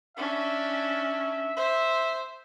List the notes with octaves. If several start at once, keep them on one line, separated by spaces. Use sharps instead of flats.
C#4 D4 E5
C5 E5